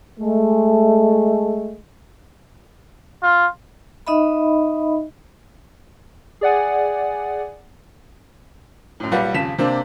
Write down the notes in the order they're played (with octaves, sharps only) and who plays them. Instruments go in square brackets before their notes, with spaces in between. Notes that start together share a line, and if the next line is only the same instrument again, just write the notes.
[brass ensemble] G#3 A3
[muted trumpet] F4
[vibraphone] D#4 D#5 E5 B5
[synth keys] G#4 D5 F#5 G#5
[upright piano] F#2 A2
B1 A#2 G3 B4 F#5
D#1 F2 C#3 B6 E7
C3 A#3 C4 D4